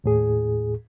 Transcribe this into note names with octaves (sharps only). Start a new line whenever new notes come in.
D#2 A2 G#4